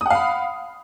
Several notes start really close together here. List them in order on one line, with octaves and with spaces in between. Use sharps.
D#6 F#5 F5 B5